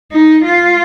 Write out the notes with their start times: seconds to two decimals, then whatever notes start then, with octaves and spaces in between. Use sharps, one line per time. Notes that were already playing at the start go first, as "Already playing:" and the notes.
0.12 D#4
0.45 F4